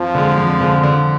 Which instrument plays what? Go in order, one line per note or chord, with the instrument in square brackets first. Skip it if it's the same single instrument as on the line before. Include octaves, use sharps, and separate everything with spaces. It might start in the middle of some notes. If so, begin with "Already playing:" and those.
Already playing: [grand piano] F2 [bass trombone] F3
[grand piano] D3 G#3
F2
D3 G#3
D3